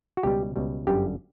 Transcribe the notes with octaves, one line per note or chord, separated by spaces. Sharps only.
F#4
C#2 B2 G3 G4
C#2 B2 G3
G1 F#2 D3 G3 G4